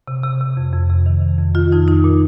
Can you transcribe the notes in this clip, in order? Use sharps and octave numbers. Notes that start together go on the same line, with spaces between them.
C3
C3
C3
F2
F2
C3
D#3
F2
F2
D#3 F4
F2 D#4
D#3 D#4
A#2